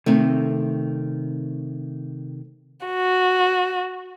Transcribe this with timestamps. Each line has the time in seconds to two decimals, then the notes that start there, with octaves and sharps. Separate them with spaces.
0.06 C3 D#3 A3 C4
2.85 F#4